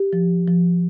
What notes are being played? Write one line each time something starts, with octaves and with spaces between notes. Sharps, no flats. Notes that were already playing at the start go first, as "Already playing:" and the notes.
Already playing: G4
F3
F3